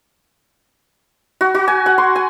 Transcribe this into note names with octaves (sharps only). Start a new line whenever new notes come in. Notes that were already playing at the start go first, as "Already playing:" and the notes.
F#4
F#4
G#5
F#5
C6
G#5